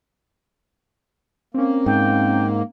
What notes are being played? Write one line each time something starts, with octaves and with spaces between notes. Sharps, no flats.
A#3 C4 C#4
G#2 G5